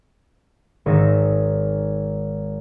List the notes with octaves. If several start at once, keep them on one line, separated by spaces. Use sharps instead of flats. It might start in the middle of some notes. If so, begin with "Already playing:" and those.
G#1 D#4 E6 A#6